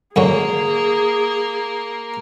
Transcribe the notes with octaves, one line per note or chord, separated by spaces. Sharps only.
F#2 D3 A#3 C#4 G#4